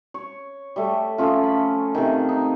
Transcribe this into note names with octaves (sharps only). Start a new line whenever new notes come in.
C#5
G3 A3
F3 A3 C#4 F4
B5
C3 D#3
D#4